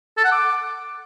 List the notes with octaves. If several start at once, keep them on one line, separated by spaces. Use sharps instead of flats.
A4
F#5
D6